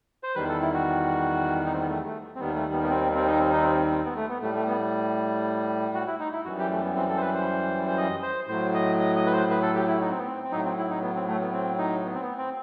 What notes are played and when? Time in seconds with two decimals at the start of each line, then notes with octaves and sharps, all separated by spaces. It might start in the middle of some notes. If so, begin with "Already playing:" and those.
0.23 C5
0.35 E2 D#3 G3 B4
0.49 A4
0.61 E4
0.74 F#4
1.65 D#4
1.73 C4
1.81 B3
1.89 A3
2.06 A3
2.35 C4
2.39 D#2 D#3 G3 B3
2.55 A3
2.73 B3
2.83 B3
2.90 C4
3.15 C4
3.27 D#4
3.39 C4
3.52 D#4
3.63 C4
3.91 C4
4.05 B3
4.17 A3
4.29 B3
4.42 A2 G3 A3
4.54 A3
4.67 B3
5.95 F#4
6.07 E4
6.20 D#4
6.32 E4
6.45 F#2 E3 G3 F#4
6.58 G4
6.71 A3
6.83 B3
6.96 C4
7.09 A4
7.17 C5
7.21 B4
7.35 C5
7.87 C5
7.98 D#5
8.23 C5
8.48 A2 F#3 C5
8.75 D#5
9.00 D#5
9.17 D#5
9.26 B4
9.33 C5
9.51 B4
9.62 A4
9.75 G4
9.88 E4
10.01 D#4
10.10 C4
10.18 B3
10.27 C4
10.44 C4
10.51 A2 F#3 D#4
10.64 C4
10.78 E4
10.90 D#4
11.02 B3
11.15 C4
11.28 A3
11.41 B3
11.53 C4
11.78 D#4
12.05 B3
12.15 C4
12.22 B3
12.38 C4